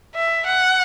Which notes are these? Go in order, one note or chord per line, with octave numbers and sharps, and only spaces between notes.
E5
F#5